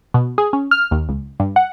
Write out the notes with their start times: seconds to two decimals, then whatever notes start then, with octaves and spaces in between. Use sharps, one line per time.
0.14 B2
0.38 G#4
0.53 C#4
0.71 F6
0.91 D#2
1.09 C#2
1.40 G2
1.56 F#5